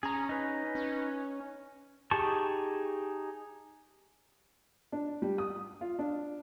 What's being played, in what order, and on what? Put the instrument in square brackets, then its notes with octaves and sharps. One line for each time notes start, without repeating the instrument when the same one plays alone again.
[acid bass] C#4 [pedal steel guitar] G#4 A#5
[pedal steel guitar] D#4 B4
[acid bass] C#4
[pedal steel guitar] D#4 G4 G#4 A5 C#6
[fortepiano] D4
G3
D#6
F4
D4